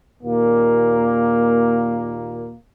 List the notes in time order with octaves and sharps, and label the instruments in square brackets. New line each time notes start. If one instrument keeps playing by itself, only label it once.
[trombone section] D#2 A#2 A#3